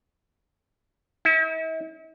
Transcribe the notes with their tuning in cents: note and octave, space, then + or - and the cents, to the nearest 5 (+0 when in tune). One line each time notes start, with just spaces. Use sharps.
E4 -40